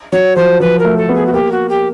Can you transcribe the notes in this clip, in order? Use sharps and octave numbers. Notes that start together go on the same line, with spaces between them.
F#3 C#5
F3 C5
F3 B4
A#4
A3
A4
B3
G#4
F#4
A#3 G4
F#4
G4